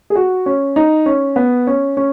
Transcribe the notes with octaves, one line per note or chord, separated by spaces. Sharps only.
G#4
F#4
C#4
D#4
C#4
B3
C#4
C#4